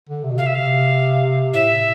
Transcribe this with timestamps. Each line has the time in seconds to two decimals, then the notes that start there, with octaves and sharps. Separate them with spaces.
0.09 D3
0.24 C3
0.31 B2
0.38 C3 F5
0.46 E5
0.54 F5
1.53 A2 E5